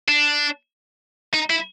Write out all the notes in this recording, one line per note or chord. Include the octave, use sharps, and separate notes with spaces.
D4
D#4
E4